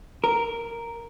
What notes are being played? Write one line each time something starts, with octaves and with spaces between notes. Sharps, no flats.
A#4